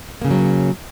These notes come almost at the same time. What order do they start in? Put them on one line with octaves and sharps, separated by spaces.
A#3 C#3 E3 F#3